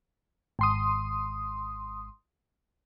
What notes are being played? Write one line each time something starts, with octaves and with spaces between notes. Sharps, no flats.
G#1 C6 D#6